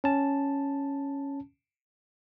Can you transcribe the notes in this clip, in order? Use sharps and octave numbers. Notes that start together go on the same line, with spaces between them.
C#4 A5